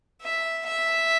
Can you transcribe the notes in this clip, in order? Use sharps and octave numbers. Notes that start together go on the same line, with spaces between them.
E5
E5